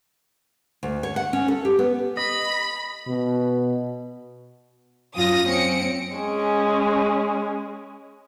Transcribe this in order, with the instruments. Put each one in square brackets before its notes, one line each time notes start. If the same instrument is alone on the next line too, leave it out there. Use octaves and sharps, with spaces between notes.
[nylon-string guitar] D2
C#5
F#5
C#4
A4
G4
B3
[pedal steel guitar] D#5 [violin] B5
[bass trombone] B2
[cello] F#2 F4 [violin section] D#6 A#6
[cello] C4 [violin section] C#4 C#7 D7
[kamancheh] G#3 C#4